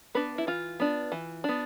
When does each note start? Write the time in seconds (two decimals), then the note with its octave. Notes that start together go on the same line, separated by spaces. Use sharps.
0.15 B3 D4 B4
0.38 E4
0.47 E3 F4
0.80 B3 D4
1.12 E3
1.44 B3 D4